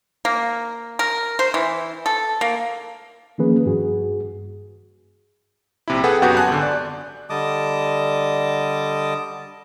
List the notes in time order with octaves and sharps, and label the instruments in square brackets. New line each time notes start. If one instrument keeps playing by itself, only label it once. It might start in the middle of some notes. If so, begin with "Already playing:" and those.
[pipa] A#3
A#4
C5
E3
A4
A#3
[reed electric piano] D#3 F3 A#3 C#4 G#4 B4
G2 F#4 G#4
[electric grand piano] A#1 C3 E4
G#4 A4 B4 F#5 G5
F#2 B3 F#4 G4 F#5 G6
G#5 A5 F#6
G#1 D3
D5
[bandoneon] D3 G3 D#5 A5 D6 D#6